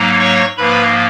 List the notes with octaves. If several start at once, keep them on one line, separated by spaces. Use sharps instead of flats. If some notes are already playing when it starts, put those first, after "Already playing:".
Already playing: G#2 F#3 A#3 D#4
C#5 C#6
G#2 F3 A#3 B4 B5